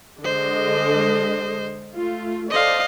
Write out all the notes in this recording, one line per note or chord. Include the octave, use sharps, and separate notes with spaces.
D3 G#3 C5 D#5
A3 F4
A4 C5 D5 D#5 F5